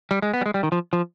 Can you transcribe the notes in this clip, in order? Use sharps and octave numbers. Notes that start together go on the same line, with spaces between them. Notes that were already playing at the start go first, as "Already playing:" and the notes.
G3
G#3
B3
G3
G#3
G3
D#3
F3
F3